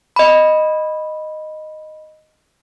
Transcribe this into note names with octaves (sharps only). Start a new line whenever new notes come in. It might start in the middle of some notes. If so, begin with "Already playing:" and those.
D#5 B5